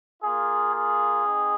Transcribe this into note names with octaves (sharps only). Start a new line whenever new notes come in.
A#3 F4 G#4
G#4
C4 D#4